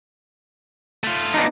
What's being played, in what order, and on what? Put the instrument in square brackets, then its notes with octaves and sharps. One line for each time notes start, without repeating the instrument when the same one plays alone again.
[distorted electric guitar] A3 F4
[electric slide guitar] B3 D4 D#4